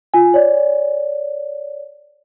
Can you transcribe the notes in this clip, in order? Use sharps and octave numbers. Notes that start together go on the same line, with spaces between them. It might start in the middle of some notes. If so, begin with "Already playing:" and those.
F4 G#5
C#5 D5